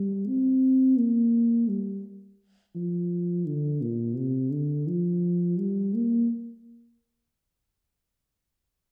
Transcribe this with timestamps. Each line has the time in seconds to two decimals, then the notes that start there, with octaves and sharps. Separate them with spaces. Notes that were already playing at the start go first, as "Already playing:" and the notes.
Already playing: G3
0.27 C4
0.98 A#3
1.68 G3
2.75 F3
3.46 D3
3.81 A#2
4.17 C3
4.52 D3
4.87 F3
5.58 G3
5.94 A#3